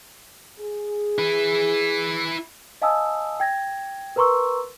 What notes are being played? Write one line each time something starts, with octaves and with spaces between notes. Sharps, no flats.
G#4
E4 B4
D#5 F5 G#5 A5 D#6 E6
G5 G#6 A#6
A#4 B4 A#5 C6 C#6 E6